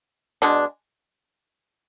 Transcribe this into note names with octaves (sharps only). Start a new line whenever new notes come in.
B2 G#3 D4